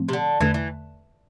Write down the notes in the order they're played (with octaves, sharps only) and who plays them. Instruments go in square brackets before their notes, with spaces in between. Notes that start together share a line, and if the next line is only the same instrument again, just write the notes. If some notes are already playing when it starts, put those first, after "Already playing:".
Already playing: [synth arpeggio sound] A2 F3 A3 C4
[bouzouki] C3
D3
[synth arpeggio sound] E2 D3 A3 [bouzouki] E3
[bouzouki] E3